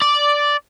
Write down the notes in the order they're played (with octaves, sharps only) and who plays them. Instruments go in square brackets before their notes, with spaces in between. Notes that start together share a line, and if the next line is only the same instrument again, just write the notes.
[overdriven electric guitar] D5